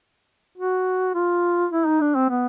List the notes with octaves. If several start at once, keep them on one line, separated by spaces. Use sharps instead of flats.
F#4
F4
E4
D#4
D4
C4
B3